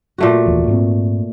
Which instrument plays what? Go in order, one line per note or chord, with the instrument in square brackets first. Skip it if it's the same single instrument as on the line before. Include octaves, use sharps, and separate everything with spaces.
[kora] A#2 A3 F#4
[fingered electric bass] F1 D#2 E3
G#2 A#3 C4